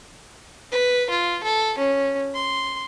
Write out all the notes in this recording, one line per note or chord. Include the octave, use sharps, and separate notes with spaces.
B4
F4
A4
C#4
C6